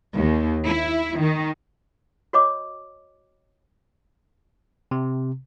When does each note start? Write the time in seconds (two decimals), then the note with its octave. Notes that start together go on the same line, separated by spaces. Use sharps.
0.15 D#2
0.67 E4
1.19 D#3
2.33 F#4 C#5 D#5 D6
4.91 C3